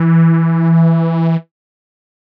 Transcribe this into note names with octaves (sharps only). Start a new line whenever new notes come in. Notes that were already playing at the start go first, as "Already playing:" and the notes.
Already playing: E3